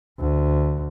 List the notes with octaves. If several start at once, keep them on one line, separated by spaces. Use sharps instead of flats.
D2